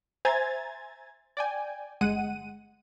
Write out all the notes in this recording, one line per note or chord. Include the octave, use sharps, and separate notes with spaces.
C5 E5 G#5 A#5 G#6 A6
D5 G5 G#5
G1 G#3 F#5 D#7